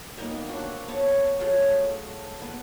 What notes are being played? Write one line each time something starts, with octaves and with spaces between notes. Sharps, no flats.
G3 A#3 B3 D#4
C4 D4 F#4
B3 C#5 A5
F#3 A3 F4 G#4
B3